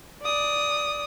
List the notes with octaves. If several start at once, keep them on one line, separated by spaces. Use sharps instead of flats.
D5 D#6